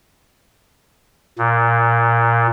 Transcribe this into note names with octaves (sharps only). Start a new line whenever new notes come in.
A#2